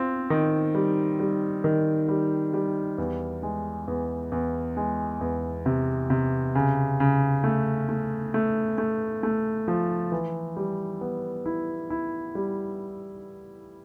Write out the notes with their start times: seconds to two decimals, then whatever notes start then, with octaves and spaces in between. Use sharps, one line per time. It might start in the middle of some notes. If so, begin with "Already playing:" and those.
Already playing: C4 F4
0.30 D#3
0.75 G3
1.20 G3
1.64 D#3
2.08 G3
2.54 G3
2.98 E2
3.43 G#3
3.88 E2
4.32 E2
4.77 G#3
5.21 E2
5.66 C3
6.10 C3
6.55 C#3
7.00 C#3
7.44 A3
7.89 A3
8.34 A3
8.78 A3
9.23 A3
9.68 F3
10.12 E3
10.57 G3
11.01 B3
11.46 E4
11.90 E4
12.35 G3